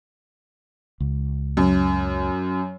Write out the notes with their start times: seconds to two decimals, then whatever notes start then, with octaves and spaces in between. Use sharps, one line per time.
1.00 C#2
1.57 F#2